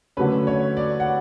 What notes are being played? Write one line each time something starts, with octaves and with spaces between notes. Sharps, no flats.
D3 F#3 A3 C#4 B4
C#5
D5
F#5